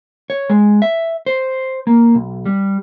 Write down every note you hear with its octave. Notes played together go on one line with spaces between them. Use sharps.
C#5
G#3
E5
C5
A#3
B1
G3